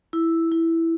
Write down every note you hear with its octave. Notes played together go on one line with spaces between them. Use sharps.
E4
E4